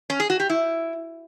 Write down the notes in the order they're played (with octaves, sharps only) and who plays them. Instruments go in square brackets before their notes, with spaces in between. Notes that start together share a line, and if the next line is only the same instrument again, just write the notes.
[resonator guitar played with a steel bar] C#4
G#4
F#4
G4
E4